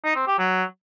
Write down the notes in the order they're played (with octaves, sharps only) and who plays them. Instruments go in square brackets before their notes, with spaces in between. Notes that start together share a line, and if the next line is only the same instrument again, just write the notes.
[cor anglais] D#4
C4
G4
F#3